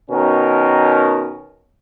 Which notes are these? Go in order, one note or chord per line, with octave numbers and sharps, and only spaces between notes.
B2 D#3 C#4 A#4